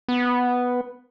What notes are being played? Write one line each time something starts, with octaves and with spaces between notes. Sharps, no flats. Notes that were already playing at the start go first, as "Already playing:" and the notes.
B3